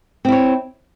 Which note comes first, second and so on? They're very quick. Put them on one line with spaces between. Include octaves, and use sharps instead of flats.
C4 E4 C#5